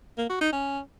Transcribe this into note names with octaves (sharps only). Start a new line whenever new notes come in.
A#3
F#4
D#4
C#4